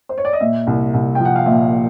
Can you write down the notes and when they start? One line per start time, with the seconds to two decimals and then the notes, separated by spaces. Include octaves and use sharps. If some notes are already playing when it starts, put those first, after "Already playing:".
0.09 C5
0.18 C#5
0.25 D5
0.33 D#5
0.40 A#2 E5
0.67 C2
0.94 C2
1.15 F3 G5
1.25 F#5
1.36 F5
1.46 A#2 E5